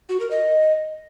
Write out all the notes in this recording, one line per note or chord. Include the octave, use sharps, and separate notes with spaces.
F#4
A#4
D#5